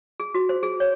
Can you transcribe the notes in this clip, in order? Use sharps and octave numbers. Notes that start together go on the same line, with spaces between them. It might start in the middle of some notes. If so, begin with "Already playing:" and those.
G#4
F#4
C5
G#4
C#5